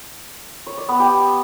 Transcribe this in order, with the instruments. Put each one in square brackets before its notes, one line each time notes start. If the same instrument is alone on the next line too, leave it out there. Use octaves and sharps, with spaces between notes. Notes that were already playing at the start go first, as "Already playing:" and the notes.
[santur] C#5
D5
B3
G4